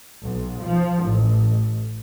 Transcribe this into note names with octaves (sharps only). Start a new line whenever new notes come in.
B1
F3
A1